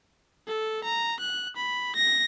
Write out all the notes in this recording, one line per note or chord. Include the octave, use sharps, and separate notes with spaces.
A4
A#5
F#6
B5
A#6